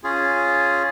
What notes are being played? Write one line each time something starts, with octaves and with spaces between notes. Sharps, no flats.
C#4 F4 G#4